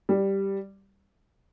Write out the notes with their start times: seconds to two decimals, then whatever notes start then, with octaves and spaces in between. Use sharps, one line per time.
0.09 G3